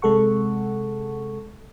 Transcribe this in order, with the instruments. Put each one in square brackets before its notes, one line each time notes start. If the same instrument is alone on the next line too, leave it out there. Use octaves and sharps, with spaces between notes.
[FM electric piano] C3 G#3 A4 F#5 C#6